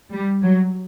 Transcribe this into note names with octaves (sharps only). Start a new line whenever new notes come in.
G3
F#3